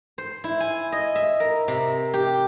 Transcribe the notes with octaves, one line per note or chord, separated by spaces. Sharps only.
C5
E4
G#5
D#5
E5
A#4
C3
G4